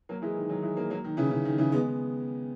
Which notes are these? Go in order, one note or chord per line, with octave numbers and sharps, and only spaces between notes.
F#3 A#3
E3 G#3
D#3
D#3 F#3
E3 G#3
F#3 A#3
F#3 A#3
D#3
C#3 E3
C#3
D#3
C#3 E3
G#3 B3